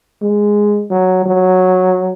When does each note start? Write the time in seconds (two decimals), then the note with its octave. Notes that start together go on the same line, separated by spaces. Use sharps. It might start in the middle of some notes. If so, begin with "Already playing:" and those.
0.22 G#3
0.90 F#3
1.26 F#3